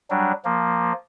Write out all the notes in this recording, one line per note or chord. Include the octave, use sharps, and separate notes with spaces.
F#3 G3 D4
F3 A#3